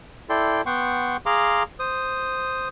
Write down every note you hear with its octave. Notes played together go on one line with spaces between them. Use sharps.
E4 A4 D5 G5 C6
B3 F#5 G5 C6 C#6
G#4 F5 A#5 C6 D6
C5 D#6